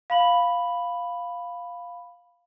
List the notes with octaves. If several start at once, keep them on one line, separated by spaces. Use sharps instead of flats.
F5 B5 F#7